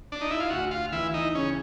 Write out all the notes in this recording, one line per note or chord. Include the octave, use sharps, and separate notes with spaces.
D4
D#4
E4
F4
D2 F#4
F4
E3 E4
D#4
C#3 C#4